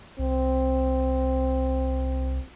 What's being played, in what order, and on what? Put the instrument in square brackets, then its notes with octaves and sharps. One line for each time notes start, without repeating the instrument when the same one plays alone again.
[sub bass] C2 [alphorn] C4